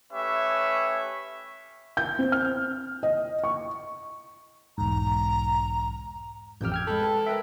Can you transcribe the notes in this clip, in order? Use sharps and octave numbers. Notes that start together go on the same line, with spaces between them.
A3 C#4 G4 B4 C#5 E5
G6
C4
F6
D#5
C#6
B1 E2 G#2 A#5
A1 F2 G4 E6 F6 G6
G5 F6 G#6
G#3 A4 B5
B4 A5
A#4 B4 E5 G5